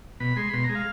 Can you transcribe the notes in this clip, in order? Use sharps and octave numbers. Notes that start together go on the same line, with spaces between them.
B2 B5
G#3 C6
B5
B2 C6
A#5
G#3
F5